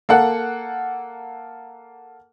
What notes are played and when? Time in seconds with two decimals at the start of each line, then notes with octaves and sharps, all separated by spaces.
0.09 A#3 A4 F#5 F#6